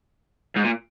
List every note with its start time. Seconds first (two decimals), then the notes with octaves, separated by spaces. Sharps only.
0.56 G#2
0.64 A#2